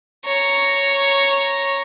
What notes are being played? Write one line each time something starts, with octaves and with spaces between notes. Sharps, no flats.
C#5 A#5